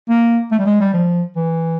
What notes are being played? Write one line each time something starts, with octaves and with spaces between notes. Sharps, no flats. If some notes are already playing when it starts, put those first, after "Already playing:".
A#3
A3
G3
G#3
G3
F3
E3